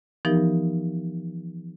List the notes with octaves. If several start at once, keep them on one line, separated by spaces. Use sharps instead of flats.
E3 F3 B3 D#4 G4 A#4